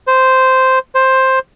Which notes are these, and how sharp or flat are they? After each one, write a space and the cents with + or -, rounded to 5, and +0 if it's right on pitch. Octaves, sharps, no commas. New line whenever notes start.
C5 -5
C5 +10